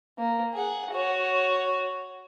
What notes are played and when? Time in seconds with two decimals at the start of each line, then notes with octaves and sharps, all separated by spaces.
0.19 A#3
0.54 G#4 F#5
0.91 F#4 C#5